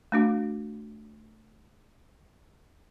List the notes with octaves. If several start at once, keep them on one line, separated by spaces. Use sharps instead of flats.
A3 D4 F#4